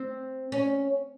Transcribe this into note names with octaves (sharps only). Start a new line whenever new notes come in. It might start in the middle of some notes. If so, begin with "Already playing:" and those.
Already playing: C4
C#4